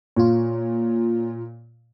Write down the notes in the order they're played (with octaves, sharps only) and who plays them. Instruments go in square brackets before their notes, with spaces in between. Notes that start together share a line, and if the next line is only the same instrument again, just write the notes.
[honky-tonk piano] A#2 [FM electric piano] F4 C#5